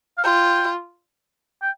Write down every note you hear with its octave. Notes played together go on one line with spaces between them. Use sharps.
F5
F4 G5
G5